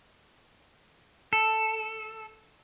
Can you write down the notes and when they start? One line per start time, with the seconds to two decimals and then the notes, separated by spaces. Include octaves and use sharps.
1.33 A4